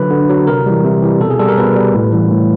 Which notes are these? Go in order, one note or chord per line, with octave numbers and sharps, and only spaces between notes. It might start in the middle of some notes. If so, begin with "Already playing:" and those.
Already playing: D3 F#3 B4
D3
F#3
C3 A#4
E3 G3
C3
E3 G3
B2 A4
G#4
G3 A4
A#4
B2 B4
G3
A2
E3 G3
A2